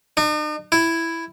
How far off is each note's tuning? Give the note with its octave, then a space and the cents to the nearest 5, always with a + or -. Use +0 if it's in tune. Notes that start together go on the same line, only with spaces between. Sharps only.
D#4 -45
E4 +5